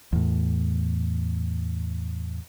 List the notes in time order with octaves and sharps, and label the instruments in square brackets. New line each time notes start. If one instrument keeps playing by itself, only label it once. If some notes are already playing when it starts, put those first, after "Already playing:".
[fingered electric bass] E2 A2